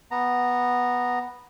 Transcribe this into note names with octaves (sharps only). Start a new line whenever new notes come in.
B3 A#5